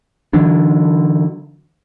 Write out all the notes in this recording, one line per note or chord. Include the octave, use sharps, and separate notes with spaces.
D3 E3 F#3 D4